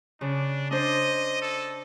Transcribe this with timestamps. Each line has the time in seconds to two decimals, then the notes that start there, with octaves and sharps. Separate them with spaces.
0.21 C#3 D4
0.71 D4 C5 D#5
1.42 A4